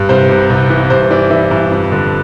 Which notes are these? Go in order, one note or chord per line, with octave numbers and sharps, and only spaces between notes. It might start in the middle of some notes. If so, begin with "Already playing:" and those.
Already playing: G2
C2 C5
C3
C2
E3
G2 C5
E3 D5
E3 E5
G2
F2
D3